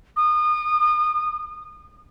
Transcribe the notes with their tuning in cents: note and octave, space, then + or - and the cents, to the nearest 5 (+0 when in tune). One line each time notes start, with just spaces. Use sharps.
D#6 -35